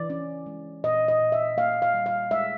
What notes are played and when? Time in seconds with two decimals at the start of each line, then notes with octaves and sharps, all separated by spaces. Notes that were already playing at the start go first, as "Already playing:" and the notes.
Already playing: E3 D5
0.10 C#4
0.46 G#3
0.84 A#2 D#5
1.08 D#5
1.21 A#2
1.32 E5
1.57 A#3 F5
1.82 F5
1.94 G3
2.06 F5
2.31 G#3 E5